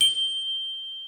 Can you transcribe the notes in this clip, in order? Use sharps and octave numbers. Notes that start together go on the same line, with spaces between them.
G7